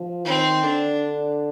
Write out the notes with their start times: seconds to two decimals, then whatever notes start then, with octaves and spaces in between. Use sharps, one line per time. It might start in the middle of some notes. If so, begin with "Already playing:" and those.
Already playing: F3
0.25 D#3 C4
0.63 D3 D4